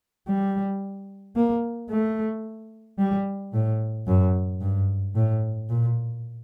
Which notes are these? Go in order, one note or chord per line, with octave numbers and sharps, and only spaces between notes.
G3
A#3
A3
G3
A2
F#2
G2
A2
A#2